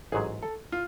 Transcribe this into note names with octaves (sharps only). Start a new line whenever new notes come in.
A1 G#2 F#3 G#4
A4
F4